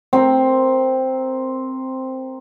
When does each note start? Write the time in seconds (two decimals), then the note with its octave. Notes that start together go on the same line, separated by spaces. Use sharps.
0.13 C4 A#4